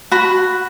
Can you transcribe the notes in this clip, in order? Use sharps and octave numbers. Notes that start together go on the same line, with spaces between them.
F#4 B5